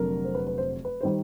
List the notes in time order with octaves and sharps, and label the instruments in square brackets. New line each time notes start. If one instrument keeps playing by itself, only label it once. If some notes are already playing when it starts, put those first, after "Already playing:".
Already playing: [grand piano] F1 F2 D3 F#3 A#4
C5
B4
B4
C5
B4
D#3 G3 C5